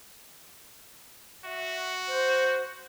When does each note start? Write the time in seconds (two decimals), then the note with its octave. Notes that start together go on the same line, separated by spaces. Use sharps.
1.45 F#4 E5
2.08 C5